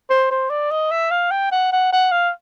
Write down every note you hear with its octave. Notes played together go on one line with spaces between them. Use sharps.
C5
C5
D5
D#5
E5
F5
G5
F#5
F#5
F#5
F5